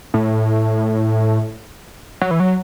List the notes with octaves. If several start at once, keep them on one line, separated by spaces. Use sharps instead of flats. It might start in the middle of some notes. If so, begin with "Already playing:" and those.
A2
F#3
E3
F#3